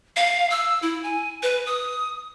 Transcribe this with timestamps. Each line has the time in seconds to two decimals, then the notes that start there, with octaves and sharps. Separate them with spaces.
0.16 F5
0.50 E6
0.82 E4
1.03 G#5
1.43 B4
1.66 D#6